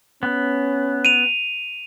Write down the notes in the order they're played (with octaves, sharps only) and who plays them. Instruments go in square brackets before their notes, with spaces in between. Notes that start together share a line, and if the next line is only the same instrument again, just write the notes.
[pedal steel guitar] B3 [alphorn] C#4
[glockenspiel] D#7 F7